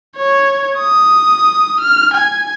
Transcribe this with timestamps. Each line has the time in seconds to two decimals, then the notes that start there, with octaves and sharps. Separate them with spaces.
0.17 C#5
0.79 D#6
1.80 F6
2.14 G#5